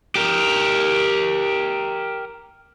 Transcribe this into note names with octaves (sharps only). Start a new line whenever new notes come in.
G4 A#4